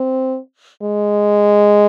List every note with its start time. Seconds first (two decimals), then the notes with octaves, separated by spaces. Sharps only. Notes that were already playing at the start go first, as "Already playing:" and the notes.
Already playing: C4
0.82 G#3